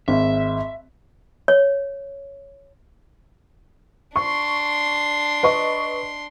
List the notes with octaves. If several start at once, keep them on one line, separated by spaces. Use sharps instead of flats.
G#1 E5
C#5
D4 C6 C#6
B4 D#5 C#6